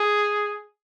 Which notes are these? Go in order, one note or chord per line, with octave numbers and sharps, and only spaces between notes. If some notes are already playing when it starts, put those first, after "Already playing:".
Already playing: G#4